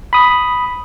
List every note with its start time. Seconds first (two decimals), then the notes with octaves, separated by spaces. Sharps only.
0.13 B5 D#6